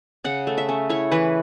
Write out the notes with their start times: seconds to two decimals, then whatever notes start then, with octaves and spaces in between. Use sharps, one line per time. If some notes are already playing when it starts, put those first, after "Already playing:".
0.24 C#3 F#5
0.47 A3
0.58 E5
0.69 C#4
0.89 E4 C#5
1.11 E3 B4